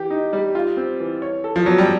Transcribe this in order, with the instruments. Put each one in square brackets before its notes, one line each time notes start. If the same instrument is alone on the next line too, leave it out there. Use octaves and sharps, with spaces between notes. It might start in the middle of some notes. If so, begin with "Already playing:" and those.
Already playing: [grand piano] E3 G4
D#4
G3
F4
C4
E3
C#5
A4
[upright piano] F3
[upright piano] F#3 [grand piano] B3
[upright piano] G3